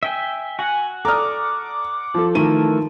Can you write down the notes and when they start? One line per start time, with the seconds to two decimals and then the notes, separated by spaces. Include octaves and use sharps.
0.03 E5 G5 G#5
0.59 F#4 F#5 G#5
1.05 A4 D5 A#5 D6 D#6 F6
2.14 F3 A4
2.35 D#3 E3 A3 E4 A#4 D#7